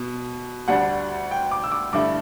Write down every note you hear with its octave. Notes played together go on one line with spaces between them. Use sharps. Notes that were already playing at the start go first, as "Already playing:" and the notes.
Already playing: B2
D2 D3 G3 D4 F#5
G5
D6
E6
D6
G2 D3 A3 E4 D6